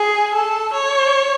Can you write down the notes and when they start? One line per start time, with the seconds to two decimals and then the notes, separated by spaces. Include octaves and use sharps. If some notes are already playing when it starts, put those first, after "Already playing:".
Already playing: G#4
0.34 A4
0.74 C#5